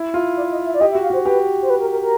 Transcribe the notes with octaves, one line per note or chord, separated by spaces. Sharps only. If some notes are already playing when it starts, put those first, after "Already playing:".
Already playing: E4
F4
D5
D#5
E5
D5
G4 D#5
E5
F#4
F5
F#4 C5
G4 B4
C5
B4
A#4
A#4
A#4